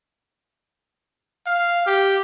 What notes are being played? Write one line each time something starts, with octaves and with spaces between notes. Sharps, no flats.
F5
G4